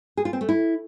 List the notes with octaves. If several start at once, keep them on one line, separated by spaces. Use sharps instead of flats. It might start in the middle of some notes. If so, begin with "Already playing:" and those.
G#4
F4
C4
A3
E4